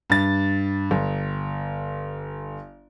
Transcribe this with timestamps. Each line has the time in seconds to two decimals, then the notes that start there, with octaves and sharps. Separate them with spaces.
0.10 G2 A6
0.91 G1